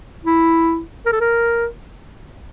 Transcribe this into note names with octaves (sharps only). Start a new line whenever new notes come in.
E4
A#4
A4
A#4